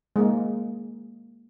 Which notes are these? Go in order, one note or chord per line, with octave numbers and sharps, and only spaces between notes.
G#3 A#3